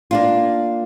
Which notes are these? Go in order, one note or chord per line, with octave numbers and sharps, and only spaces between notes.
A#3 D4 F4